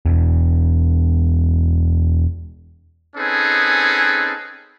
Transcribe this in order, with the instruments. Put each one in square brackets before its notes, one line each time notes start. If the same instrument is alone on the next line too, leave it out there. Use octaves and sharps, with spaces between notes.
[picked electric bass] E1 E2
[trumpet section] C4 C#4 D#4 G#4 A4 B4